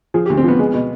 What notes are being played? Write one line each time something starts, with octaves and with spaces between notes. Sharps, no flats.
F3 G#4
G4
D2
C4
F3 B3
G#3
B2